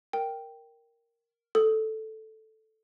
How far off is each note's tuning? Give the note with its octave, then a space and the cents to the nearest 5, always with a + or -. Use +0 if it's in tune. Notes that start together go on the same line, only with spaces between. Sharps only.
A#4 +0 G5 +0
A4 -5 D#6 +15